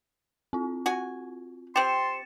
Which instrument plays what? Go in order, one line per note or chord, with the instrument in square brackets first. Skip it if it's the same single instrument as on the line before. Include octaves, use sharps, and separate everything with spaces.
[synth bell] C4 F4
[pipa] F#4 G#5
[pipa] C4 G4 [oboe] C6 [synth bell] A6 C#7 E7